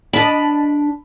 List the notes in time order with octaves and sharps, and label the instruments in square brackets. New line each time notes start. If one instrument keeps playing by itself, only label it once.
[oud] D4 D#5 [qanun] B5